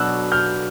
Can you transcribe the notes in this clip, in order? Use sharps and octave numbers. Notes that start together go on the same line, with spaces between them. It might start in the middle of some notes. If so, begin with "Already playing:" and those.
Already playing: B2 F#3 B3 D4 E6 F#6
F6 G6